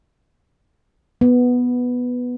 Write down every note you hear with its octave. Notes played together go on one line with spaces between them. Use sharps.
B3